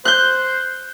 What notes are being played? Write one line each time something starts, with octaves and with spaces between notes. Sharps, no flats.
C5 F#6 G6